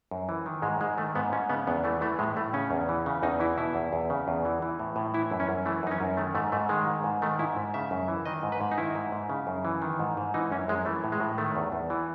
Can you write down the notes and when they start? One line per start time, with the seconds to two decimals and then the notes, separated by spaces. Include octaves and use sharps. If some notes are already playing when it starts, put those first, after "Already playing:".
0.11 F#2
0.29 E3
0.46 D#3
0.62 G#2 G#3
0.81 G#2 G#3
0.98 D#3 A3
1.15 G#2 B3
1.33 G#2 C#4
1.49 C#3 B3
1.67 E2 B3
1.84 E3 A3
2.01 E3 A3
2.19 A2 G#3
2.37 A2 A3
2.53 C#3 C#4
2.71 E2
2.89 E3
3.06 C#3
3.23 E2 D#4
3.40 E3 E4
3.58 B2 E4
3.75 E2
3.93 E2
4.10 C#3
4.28 E2
4.45 E3
4.62 E3
4.79 A2
4.96 A2
5.14 E3 E4
5.31 F#2
5.40 C#4
5.49 F#2
5.66 E3 A3
5.83 F#2 D#4
5.91 C#4
6.01 F#2
6.17 D#3 A3
6.35 G#2 A3
6.52 G#2 A3
6.69 D#3 G#3
6.87 G#2
7.04 G#2
7.22 D#3 A3
7.39 G#2 E4
7.57 G#2
7.74 C#3 E5
7.91 F#2
8.08 E3
8.26 D#3 D#5
8.43 G#2
8.52 B4
8.61 G#2
8.72 D#4
8.78 D#3 E4
8.95 G#2
9.12 G#2
9.30 C#3
9.47 F#2
9.65 E3
9.82 D#3
9.99 G#2
10.17 G#2
10.34 E3 D#4
10.52 F#2 C#4
10.68 F#2 G#3
10.85 E3 A3
11.04 A2
11.12 G#3
11.20 A2
11.38 D#3 A3
11.55 E2
11.72 E2
11.90 E3